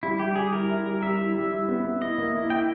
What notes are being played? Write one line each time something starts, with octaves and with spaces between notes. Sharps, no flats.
G3 E4
G3 G4
G3 G#4
E4 A#4
E4
G3
G3 E5
E4
G3
E4
B3
B3
E4 D#5
A#3
E4
E4 G5